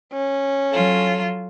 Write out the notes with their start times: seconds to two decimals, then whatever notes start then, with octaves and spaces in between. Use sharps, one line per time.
0.13 C#4
0.71 F#3 F4 A4